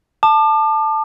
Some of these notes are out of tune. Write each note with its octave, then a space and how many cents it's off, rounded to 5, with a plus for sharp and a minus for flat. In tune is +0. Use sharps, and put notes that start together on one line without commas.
A5 +0 D6 +40